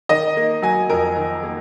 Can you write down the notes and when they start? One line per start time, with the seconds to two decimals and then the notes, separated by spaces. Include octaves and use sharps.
0.09 D#3 D#5
0.37 A#3
0.62 F#3 G#5
0.89 F2 A#4
1.16 D#3
1.43 A#3